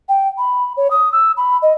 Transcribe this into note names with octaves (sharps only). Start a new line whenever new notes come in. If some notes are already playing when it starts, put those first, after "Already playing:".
G5
B5
C#5
D#6
E6
B5
D#5